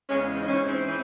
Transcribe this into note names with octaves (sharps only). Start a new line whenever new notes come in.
E2 C#3 G#3 C#4
C4
D#4
G#2 E3 C4 C#4
C4
E3 C4